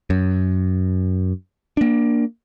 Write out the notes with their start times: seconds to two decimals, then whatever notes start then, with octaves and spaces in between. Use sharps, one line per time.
0.10 F#2
1.77 A#3 D4